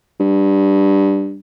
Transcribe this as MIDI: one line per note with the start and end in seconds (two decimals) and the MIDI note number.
0.20 1.39 43